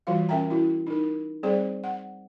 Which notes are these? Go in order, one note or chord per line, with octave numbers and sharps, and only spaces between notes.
E3 G3 F4 F#4 F5
C#4 A#4 E5 G5 A#5
E4 F#4
D#4 A#4
G3 C4 G#4 C5 D5
F#5